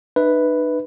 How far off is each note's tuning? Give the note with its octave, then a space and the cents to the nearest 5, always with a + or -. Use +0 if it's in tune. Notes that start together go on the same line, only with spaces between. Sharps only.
D#4 -45 B4 +0 E5 -25